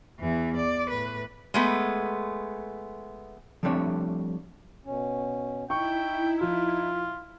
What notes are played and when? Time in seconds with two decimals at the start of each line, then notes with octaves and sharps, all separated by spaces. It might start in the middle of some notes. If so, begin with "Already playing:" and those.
0.20 E2 E3
0.56 D5
0.89 A2 B4
1.54 G#3 A3 B3
3.63 F3 G3 A3 C4 D4 C#5
4.85 B2 C#4
5.70 D#4 E4 G5 C#6
6.41 F3 F4